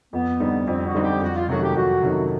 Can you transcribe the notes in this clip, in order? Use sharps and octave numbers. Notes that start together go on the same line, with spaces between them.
F2 B3
D3 G3 C4 D#4
F2 C4
F#4
D3 G3 C4 D#4
G4
F2 F#4
F4
C3 D#3 F#3 A3 F#4
G4
F2 F#4
C3 D#3 F#3 A3